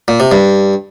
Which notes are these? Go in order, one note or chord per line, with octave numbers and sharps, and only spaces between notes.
A#2
C3
G2